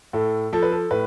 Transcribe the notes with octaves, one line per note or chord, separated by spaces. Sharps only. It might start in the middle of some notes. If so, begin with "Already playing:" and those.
A2 A4
F3 A4
B4
A4
A2 B4